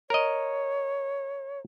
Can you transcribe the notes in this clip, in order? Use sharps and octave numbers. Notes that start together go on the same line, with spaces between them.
A#4 C#5 D#5